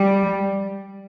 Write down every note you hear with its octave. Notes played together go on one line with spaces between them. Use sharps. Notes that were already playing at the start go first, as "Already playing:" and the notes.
Already playing: G3